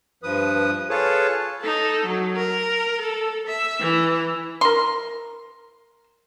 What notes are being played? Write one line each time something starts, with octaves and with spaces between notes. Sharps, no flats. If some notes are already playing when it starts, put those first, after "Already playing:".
G2 F3 B4 D#6
F4 G#4 A4 B4 C#5 A5
D#4 A4
F#3
A#4
A4
E5
E3
A#4 C6